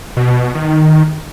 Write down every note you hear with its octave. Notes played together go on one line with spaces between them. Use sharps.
B2
D#3